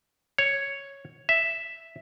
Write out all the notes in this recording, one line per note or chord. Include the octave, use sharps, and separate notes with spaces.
C#5
E5